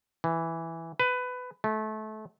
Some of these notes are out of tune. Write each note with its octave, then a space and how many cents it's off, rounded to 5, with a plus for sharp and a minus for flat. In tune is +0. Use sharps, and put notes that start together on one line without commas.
E3 +0
B4 +15
A3 -25